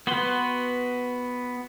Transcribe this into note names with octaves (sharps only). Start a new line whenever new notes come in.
B3 F#4 B4 C6